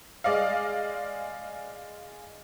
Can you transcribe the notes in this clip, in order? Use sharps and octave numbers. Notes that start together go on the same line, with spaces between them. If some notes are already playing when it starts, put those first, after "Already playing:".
G#3 D5 D#5 F5